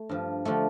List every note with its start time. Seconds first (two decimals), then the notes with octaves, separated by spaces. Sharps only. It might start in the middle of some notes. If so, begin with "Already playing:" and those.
Already playing: A3
0.09 G2 F3
0.45 D3 F3 A3